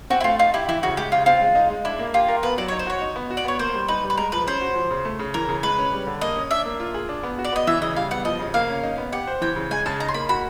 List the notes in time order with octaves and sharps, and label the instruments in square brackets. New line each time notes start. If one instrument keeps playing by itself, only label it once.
[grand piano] C4 [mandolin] F#4
[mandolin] E4
[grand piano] A3 [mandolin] F4
[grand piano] D#4 [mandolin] F4
[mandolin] E4 [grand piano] G4
[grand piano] E3 [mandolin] E4
[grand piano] C#3 [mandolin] F#4
[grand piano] G#3 [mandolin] G4
[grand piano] C#3 [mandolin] F4
[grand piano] C4 [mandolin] F4
[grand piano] G#3
D#4
G#3
[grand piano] D4 [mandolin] E4
[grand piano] A#3
[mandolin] F4 [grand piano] G4
[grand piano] A#4
[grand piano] B3 [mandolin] B4
[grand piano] F#3 [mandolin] D5
[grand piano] D#4 [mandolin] C#5
[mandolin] C5
[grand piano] F#4 [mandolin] C#5
[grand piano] D#4
B3
F#4
[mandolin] D5
[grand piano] B3 [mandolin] C#5
[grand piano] A#3 [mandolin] C5
[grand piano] G3
[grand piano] D#4 [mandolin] B4
[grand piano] G3
[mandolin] B4
[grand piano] G#3 [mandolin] A#4
[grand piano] F3 [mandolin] B4
[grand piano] C#4 [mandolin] C5
[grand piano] F#4
F3
C#3
A3
C#3
[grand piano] E3 [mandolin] A#4
[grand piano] C#3
[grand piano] G#3 [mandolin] B4
[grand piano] C#4
G3
D3
[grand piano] A#3 [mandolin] D#5
[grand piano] C#4
[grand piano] D4 [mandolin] E5
[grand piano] A#3
F4
G#4
D4
B3
F#4
[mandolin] D5
[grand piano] B3 [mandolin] D#5
[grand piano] E3 [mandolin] E5
[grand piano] C#3 [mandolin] D#5
[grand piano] G3 [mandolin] F5
[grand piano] B3 [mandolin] F#5
[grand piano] F3 [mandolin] D#5
[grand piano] C#3
[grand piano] A#3 [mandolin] F5
[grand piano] C#4
D#4
B3
[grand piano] G4 [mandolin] F#5
[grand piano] C5
[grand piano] E3 [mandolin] G5
[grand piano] C#3
[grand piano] G#3 [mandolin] G#5
[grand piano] C#3 [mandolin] A5
[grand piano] D#4 [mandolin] A#5
[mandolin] C6
[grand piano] A#3 [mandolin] B5
[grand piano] F#4 [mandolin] B5